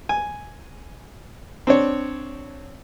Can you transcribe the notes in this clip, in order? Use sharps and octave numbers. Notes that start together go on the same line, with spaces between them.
G#5
C4 D4 C#5